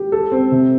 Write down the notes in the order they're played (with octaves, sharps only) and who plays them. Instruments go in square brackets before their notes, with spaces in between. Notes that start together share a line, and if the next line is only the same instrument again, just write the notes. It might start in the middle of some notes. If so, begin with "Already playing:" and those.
Already playing: [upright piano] G4
A4
C4
C3